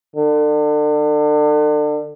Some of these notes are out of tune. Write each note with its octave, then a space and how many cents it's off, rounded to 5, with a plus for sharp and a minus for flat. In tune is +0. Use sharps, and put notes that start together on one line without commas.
D3 +35